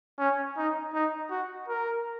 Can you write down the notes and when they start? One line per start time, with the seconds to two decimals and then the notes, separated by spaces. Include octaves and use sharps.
0.19 C#4
0.57 D#4
0.94 D#4
1.30 F#4
1.68 A#4